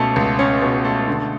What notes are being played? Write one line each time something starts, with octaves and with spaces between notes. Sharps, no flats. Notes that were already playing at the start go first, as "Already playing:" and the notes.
Already playing: C#2 B2 A3 C#4
C#2
C#4
B2
A3
D3